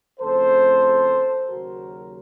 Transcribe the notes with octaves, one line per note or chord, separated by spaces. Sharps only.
F2 C#3 A3 A4 C5
D#2 C#3 F#3 F#4 A#4